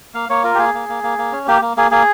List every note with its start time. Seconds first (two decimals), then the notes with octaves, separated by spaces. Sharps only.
0.14 A#3 F5
0.29 A#3 C#5
0.43 F4 A#4
0.55 G4
0.58 A#3 G#4
0.74 A#3
0.89 A#3
1.03 A#3
1.18 A#3
1.32 C#4
1.47 A#3 G4
1.62 A#3
1.77 A#3 G#4
1.91 A#3 G#4